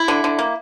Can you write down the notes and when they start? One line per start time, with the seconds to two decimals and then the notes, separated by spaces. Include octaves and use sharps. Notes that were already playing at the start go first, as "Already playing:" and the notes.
Already playing: E4
0.08 D3
0.24 D3
0.39 A#3